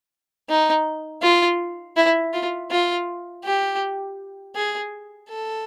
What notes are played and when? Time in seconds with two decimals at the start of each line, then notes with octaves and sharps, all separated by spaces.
0.49 D#4
1.22 F4
1.97 E4
2.33 F4
2.71 F4
3.45 G4
4.55 G#4
5.29 A4